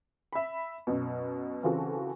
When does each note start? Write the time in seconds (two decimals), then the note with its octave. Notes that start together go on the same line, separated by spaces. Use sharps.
0.33 E5 B5
0.87 F#2 B2
1.63 C#3 E3 C4 F4 F#4 A4